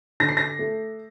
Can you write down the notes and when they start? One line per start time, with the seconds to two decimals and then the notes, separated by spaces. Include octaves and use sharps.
0.20 D3 A#6
0.29 C7
0.37 A#6
0.59 A3